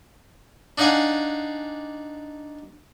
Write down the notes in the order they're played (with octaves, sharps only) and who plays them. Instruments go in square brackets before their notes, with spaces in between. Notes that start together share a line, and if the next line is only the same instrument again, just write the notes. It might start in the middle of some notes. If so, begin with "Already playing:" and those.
[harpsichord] D4 D#4 D5 F5 F#5 G#5